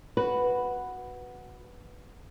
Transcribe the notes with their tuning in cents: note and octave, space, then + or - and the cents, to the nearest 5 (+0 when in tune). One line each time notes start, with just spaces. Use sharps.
F#4 +0 B4 +0